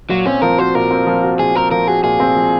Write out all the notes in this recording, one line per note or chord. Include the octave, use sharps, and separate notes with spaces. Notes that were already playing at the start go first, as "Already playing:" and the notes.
A#2 F#3
C4 C#4
F3 A#4
F#4 C5
A#2 A#4
C4
F3
F#4
A#2 G#4
C4 A#4
F3 A#4
F#4 G#4
A#2 G#4
C4
F3